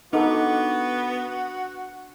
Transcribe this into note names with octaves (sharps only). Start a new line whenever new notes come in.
B3 D4 D#4 F#4 A4 F#5 D6